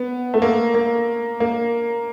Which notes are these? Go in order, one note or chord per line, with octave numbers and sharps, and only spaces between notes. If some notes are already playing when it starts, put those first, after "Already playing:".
Already playing: B3
A3
A#3
A#3
A#3